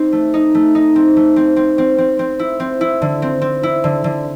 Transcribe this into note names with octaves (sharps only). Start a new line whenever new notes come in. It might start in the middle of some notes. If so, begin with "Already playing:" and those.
Already playing: C4 D#4
A3
D#4
A3
D#4
C4
A3
C4
C4
C4
C4
C4
E4
C4
E4
D3
C4
C4
E4
D3
D3